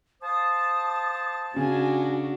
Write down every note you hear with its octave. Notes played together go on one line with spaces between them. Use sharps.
C5 F5 A5 D#6
C#3 D4 F#4 G#5